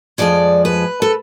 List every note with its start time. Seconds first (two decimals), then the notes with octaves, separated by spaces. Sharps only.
0.18 F2 F3 G#3 D5
0.65 B4
1.02 A4